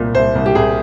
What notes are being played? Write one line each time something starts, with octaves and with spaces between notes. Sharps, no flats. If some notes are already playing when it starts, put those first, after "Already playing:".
Already playing: C2 A#2
C2 C5
C2
G4
C2 G#4